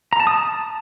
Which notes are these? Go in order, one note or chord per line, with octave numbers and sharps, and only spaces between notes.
A#5
A5
D#6
A5